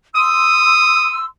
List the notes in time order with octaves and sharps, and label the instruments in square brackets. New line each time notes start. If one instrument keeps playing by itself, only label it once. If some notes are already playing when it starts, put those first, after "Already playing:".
[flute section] C6 E6 [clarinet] D#6